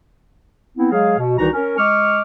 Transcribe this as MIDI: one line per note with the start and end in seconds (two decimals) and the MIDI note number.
0.77 0.89 59
0.77 0.89 60
0.77 0.89 64
0.91 1.18 54
0.91 1.18 56
0.91 1.18 68
0.91 1.18 77
1.18 1.35 47
1.38 1.47 36
1.38 1.47 51
1.38 1.47 52
1.38 1.47 63
1.38 1.47 66
1.38 1.47 82
1.53 1.77 61
1.53 1.77 70
1.77 2.21 56
1.77 2.21 75
1.77 2.21 85
1.77 2.21 86
1.77 2.21 89